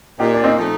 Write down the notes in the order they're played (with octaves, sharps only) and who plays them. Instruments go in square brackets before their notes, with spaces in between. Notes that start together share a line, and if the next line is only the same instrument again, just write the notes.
[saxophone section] A#2 [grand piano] D#4 G4
[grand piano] D4
C4 D#4
[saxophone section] F3 A3 D#4